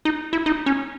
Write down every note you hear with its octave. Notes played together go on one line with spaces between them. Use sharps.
D#4
E4
D#4
C#4